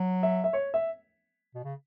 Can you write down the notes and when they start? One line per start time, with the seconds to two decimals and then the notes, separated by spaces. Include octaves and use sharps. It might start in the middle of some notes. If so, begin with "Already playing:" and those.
Already playing: F#3
0.23 E5
0.44 E5
0.53 C#5
0.74 E5
1.55 B2
1.64 C#3